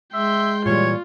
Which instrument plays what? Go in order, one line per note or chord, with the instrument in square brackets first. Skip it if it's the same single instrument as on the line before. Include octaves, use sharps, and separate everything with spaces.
[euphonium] G#3 [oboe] E5 [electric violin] G5 C6
[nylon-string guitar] A#2 E3 G3 [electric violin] F4 [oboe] C#5